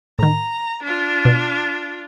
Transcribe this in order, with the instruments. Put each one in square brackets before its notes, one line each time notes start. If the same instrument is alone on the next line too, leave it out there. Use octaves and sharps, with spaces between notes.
[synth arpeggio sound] A2 D#3 [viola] A#5
[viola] D4 F4
[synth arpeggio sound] B2